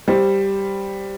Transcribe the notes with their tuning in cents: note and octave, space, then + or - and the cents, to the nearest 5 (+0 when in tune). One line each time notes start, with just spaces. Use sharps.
G3 +0 C5 +0